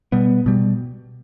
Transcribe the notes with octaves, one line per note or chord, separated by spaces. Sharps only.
B2 G3 B3
B2 G3